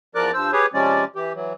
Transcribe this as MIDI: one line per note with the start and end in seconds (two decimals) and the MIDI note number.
0.15 0.31 40
0.15 0.31 53
0.15 0.31 70
0.15 0.31 74
0.15 0.31 86
0.15 0.31 90
0.34 0.51 43
0.34 0.51 53
0.34 0.51 72
0.34 0.51 88
0.52 0.66 67
0.52 0.66 68
0.52 0.66 71
0.52 0.66 73
0.74 1.04 48
0.74 1.04 53
0.74 1.04 56
0.74 1.04 61
0.74 1.04 74
1.16 1.33 52
1.16 1.33 67
1.35 1.53 52
1.35 1.53 54